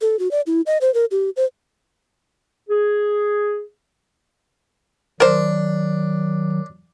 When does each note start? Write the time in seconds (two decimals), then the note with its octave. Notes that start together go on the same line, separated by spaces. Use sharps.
0.01 A4
0.19 F#4
0.31 D5
0.47 E4
0.66 D#5
0.81 C5
0.94 A#4
1.11 G4
1.37 C5
2.70 G#4
5.20 D#3 F#3 D4 A#4 C5